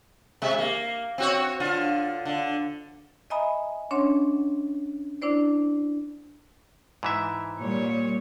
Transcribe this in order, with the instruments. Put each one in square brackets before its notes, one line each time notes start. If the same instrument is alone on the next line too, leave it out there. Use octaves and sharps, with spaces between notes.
[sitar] C3 G#3 E5
A#3
C4 F#4 C#5
D3 F4
D3
[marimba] D#5 E5 G#5 A#5 B5 D#6
C#4 D4 C#5 F#5 C6
D4 E4 C5 D5
[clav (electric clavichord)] G#2 E3 E5
[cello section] A#2 G3 C#5